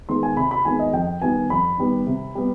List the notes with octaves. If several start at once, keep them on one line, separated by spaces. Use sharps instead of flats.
D#3 G#3 B3 C6
G#5
C3 B5
B5
D#3 G#3 B3 G#5
D#5
F2 G5
D#3 G3 B3 G#5
F2 B5
D#3 G3 B3
C3
G3 B3